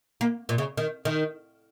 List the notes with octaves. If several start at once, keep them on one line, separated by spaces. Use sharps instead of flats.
A#3
A#2
C#3
D#3
D#3